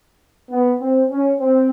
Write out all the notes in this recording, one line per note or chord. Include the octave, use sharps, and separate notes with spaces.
B3
C4
C#4
C4